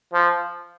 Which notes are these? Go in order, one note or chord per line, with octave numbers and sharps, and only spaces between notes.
F3